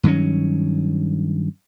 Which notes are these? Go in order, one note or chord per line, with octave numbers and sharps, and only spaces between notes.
G2 D#3 F#3 C#4